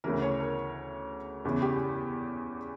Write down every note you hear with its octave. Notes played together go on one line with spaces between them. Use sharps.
D2 C#3 E3 A#4
C#5
A#4
E2 C#3 E3
G4